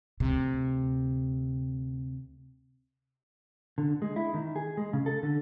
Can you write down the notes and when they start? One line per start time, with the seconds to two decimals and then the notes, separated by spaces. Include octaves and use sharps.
0.20 D2 C3
3.78 D3
4.02 G#3
4.16 E4
4.34 D#3
4.56 G#4
4.77 G#3
4.93 C#3
5.06 A4
5.23 D3